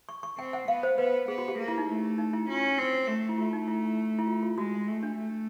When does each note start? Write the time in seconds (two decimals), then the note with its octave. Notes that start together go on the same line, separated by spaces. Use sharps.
0.09 C#6
0.23 C#6
0.38 C4 G5
0.53 F#5
0.68 B3 F5
0.83 C5
0.98 B3 B4
1.28 B3 G#4
1.38 F#4
1.48 G4
1.58 A#3 G#4
1.68 E4
1.78 D#4
1.89 A3
2.18 D#4
2.33 E4
2.48 C#4 F4
2.78 C4
3.07 A3
3.29 E4
3.38 A3 F4
3.53 D#4
3.68 E4
4.19 E4
4.27 F4
4.43 F4
4.58 G#3 F#4
4.88 A3
5.03 D4
5.18 A3